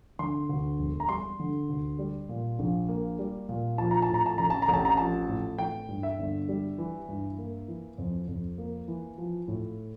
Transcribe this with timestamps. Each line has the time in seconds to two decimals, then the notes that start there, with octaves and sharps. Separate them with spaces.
0.19 D3 C6
0.49 D2
0.79 E1
1.00 A#5
1.09 G3 C6
1.39 D3
1.69 D2
1.99 G3
2.29 A#2
2.59 A#1
2.88 A#3
3.19 G3
3.49 A#2
3.78 F3 A5
3.91 A#5
4.02 A5
4.09 A2
4.14 A#5
4.26 A5
4.38 A1 A#5
4.50 A5
4.62 A#5
4.68 A1
4.74 A5
4.85 A#5
4.97 F3 A5
5.29 A2
5.58 E3 G5
5.89 G2
6.03 E5
6.19 G1
6.49 G3
6.78 E3
7.08 G2
7.38 A#3
7.68 E3
7.98 F2
8.28 F2
8.58 A#3
8.88 E3
9.18 F3
9.48 A2